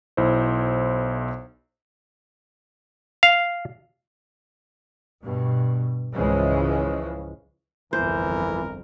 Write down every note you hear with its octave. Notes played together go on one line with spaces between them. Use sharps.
B1 E4 C5
F5
G2 B2
C#2 G#2 C#3 E3 F3 G#3
G1 C2 F2 E3 A#4 C5